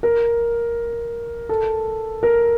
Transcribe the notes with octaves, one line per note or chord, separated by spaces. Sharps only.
A#4
A4
A#4